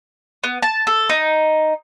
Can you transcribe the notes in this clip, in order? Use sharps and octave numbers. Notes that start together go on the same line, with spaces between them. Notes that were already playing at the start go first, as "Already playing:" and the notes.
B3
A5
A4
D#4